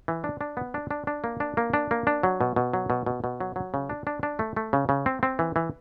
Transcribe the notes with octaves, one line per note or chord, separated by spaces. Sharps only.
E3
D4
D4
B3
D4
D4
D4
A#3
D4
A#3
D4
A#3
D4
F#3
B2
B2
F#3
B2
B2
B2
F#3
F#3
C#3
D4
D4
D4
A3
A3
C#3
C#3
C4
C4
E3
E3